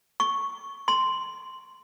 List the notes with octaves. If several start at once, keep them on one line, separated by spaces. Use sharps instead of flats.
C#6
C6